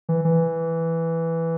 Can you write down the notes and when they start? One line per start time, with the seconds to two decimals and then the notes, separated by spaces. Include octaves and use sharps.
0.09 E3
0.25 E3